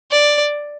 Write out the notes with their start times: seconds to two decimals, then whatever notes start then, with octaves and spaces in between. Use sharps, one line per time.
0.11 D5